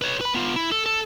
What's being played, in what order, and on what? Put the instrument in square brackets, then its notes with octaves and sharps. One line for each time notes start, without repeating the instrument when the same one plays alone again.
[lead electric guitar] B4 C#5
B4 B5
B3 F4
E4
A4
A4